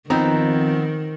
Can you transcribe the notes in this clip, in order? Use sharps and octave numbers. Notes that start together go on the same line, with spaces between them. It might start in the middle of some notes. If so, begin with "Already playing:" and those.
F2 D#3 B3 C4 D#4